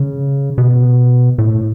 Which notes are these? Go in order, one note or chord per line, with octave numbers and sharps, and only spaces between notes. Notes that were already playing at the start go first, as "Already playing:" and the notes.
Already playing: C#3
B2
A2